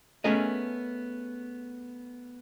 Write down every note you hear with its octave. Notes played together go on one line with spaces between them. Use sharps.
A3 B3 C#4 G#4 A#4 D#5